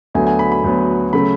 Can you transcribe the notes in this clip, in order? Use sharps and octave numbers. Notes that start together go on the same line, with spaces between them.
D2 D3 F#3 B3 G#5
G#5
B5
B5
D2 D3 F#3 B3
C#3 F#3 A3 B5